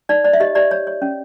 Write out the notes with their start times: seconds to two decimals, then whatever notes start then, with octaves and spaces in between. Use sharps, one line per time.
0.09 D#4 D5
0.24 C5 D5
0.33 E5
0.40 G4 D#5
0.55 G4 D5
0.71 C#5
0.87 C#5
1.02 C#4